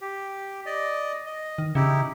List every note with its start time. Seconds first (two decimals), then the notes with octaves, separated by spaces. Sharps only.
0.01 G4
0.66 D5 D#5
1.26 D#5
1.58 D#3
1.75 C#3 D#4 E4 G4